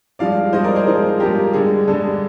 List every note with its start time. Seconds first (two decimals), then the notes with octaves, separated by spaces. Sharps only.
0.19 G2 F3 G#3 D5 F5
0.53 G2 F3 G#3 C5 D#5
0.64 A#4 D5
0.75 G#4 C5
0.86 G2 F3 G#3 G#4 C5
1.20 G2 F3 G#3 G4 A#4
1.53 G2 D3 G#3 G#4
1.88 G2 D3 G#3